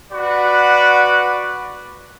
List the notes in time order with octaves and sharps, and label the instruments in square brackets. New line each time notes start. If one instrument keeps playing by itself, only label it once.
[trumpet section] F#4 B4 D5 F#5